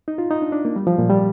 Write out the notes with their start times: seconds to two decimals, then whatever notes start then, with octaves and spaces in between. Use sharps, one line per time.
0.08 D#4
0.18 F4
0.31 D#4
0.42 D4
0.52 D4
0.65 A#3
0.76 G3
0.87 F3
0.98 A#2
1.10 G3